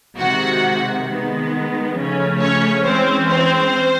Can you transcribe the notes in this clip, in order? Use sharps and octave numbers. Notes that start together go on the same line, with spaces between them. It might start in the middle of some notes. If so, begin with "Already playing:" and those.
C3 D#3 G#3 F#4 F#5
D#3 G#3 B3
C#3 F3 A3 C#4
C#4 C#5
E3 G#3 C4 C#4 C5
C4 C5